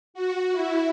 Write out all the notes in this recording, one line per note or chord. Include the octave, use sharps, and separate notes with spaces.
F#4
E4